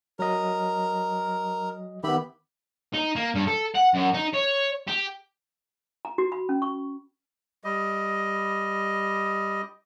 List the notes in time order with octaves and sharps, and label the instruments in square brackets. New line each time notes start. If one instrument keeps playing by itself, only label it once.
[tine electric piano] F#3 D#5 [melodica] A#4
[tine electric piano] D#3 B3 [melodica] G4 E5 B5
[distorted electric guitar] D#4
A#3
G2
A4
F#5
F#2
D#4
C#5
G4
[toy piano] A#5
F#4
B5
C#4
C#6
[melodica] G3 D#5